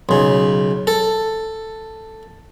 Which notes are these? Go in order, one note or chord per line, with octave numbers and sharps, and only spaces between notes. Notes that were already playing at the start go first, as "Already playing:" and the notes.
B1 C#3
A4